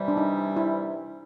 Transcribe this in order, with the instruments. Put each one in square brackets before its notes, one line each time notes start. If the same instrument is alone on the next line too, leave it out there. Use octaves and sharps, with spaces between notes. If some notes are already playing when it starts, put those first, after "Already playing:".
Already playing: [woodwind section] C3 E3 G3
[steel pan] D4
D#4
E4